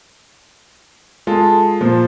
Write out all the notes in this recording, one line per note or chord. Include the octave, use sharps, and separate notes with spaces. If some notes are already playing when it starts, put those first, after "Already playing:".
G#3 F4 G#4 A4 A5
A#2 F3